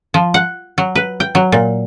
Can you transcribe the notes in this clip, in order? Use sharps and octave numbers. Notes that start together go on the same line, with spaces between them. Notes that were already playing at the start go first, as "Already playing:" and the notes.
F3
F#5
F#3
B4
G5
F#3
A#2